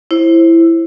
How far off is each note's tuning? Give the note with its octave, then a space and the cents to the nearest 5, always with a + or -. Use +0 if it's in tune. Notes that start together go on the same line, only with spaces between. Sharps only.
E4 +10 C5 +20